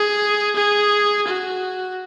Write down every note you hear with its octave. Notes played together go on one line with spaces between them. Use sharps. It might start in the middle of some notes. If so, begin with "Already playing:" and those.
Already playing: G#4
G#4
F#4